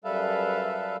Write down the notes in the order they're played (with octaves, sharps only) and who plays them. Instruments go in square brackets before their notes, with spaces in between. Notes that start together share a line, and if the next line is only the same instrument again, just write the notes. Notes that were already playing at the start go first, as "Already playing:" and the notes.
[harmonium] F#2 G3 A4 B4 E5 F5